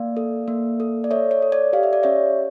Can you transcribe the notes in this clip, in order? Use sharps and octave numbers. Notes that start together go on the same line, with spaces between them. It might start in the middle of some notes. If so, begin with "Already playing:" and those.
Already playing: A#3 D5 F5
A4
A#3
A4
D5
A4 C#5 E5
C#5
A4
D5
G4 F5
E5
D5
C#4 C#5 E5